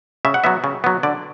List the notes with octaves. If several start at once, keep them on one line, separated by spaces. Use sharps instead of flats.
C#3 E5
F#5
F#3 B3 E5
C#3
F#3 B3
D3 D5